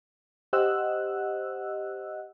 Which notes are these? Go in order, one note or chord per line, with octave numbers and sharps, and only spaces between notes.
G4 C5 D#5 F#5 E6 F#6